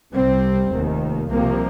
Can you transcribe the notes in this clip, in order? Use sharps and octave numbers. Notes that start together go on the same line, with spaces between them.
C2 C3 G3 C4
F1 D#2 D#3
C2 C3 F3 A#3